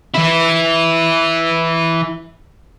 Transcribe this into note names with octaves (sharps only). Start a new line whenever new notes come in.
E3 E4